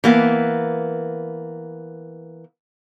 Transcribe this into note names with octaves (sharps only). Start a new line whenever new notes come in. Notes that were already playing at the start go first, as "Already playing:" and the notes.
E3 A#3 B3